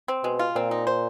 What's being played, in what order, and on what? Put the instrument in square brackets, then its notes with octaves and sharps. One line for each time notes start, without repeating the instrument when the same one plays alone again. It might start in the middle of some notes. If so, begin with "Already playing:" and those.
[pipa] C4
[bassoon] B2 [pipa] G#3
[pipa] F4
[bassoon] A#2 [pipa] C4
[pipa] D#4
C5